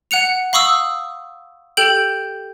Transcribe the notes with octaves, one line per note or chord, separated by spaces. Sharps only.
F#5 F#6 C#7 F7
F5 B5 C#6 D#6 E6
G4 A4 G5 G6 D7 F#7